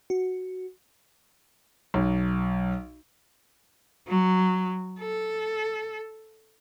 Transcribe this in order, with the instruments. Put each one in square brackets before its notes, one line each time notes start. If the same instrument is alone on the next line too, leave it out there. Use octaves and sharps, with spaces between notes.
[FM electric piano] F#4
[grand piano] B1
[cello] F#3
A4